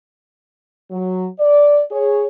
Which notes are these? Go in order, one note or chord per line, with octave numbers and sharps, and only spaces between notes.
F#3
D5
G#4 C#5